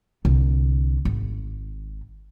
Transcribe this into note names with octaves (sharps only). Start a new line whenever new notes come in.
C2 D3
G#1